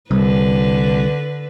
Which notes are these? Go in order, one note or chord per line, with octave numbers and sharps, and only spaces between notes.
C2 D3 B4